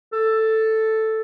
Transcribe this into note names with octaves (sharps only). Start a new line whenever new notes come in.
A4